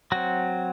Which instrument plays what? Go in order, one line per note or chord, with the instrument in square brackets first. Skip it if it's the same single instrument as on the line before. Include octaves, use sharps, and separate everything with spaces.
[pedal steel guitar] F#3 C4 F#4